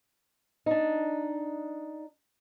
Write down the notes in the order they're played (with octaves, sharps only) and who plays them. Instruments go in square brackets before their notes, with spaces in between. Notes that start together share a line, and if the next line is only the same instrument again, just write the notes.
[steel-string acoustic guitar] D4 D#4